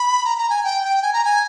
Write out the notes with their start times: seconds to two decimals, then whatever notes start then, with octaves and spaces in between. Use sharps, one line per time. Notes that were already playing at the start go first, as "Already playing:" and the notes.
Already playing: B5
0.25 A#5
0.38 A#5
0.50 G#5
0.64 G5
0.83 G5
1.02 G#5
1.13 A#5
1.24 G#5